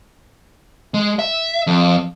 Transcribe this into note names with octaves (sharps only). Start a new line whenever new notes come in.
G#3
E5
F2